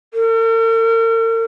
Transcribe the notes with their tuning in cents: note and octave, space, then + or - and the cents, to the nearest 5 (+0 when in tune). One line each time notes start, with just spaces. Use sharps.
A#4 -45